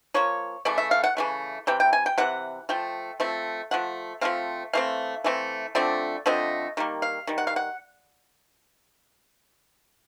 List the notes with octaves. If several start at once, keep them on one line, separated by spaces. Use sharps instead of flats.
F3 A#3 C#5
C#3 E3 A3 D5
E5
F5
F#5
C#3 E3 A3
C3 E3 G5
G5
G#5
G5
C3 E3 F#5
F3 A3 G5
F3 A3 C4
F3 A3 F#5
F3 A3 C4 F5
E3 A3 C4 F5
E3 A3 C4
D3 F3 A3 C4 D5
D3 F3 A3 C4 D#5
D#3 G3 A#3
F5
D#3 G3
F#5
F5
F#5